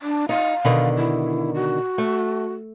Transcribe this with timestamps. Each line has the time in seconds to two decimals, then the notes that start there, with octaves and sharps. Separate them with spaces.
0.01 D4
0.29 D#4 F5
0.65 B2 D3 D#3
0.97 E4
1.54 F#4
1.98 A3